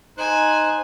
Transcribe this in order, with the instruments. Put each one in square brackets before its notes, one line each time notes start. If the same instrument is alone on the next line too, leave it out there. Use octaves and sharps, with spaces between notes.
[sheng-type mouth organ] D#4 C5 F#6 [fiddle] G#5